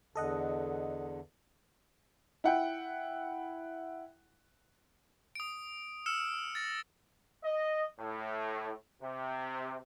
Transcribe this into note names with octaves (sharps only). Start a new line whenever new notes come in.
E2 D3 A4 D#5 F#5
E4 F#5 G5
D#6 D7
E6 F6 C#7 E7
A6 A#6
D#5
A2
C3